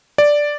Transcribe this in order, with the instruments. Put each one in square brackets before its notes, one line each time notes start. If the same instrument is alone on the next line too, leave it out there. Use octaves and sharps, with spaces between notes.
[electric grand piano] D5